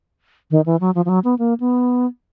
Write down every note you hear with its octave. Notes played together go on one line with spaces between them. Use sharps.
D#3
E3
F#3
F3
F3
F#3
B3
A#3
B3